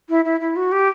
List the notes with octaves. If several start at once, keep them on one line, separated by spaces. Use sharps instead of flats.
E4
E4
E4
F#4
G4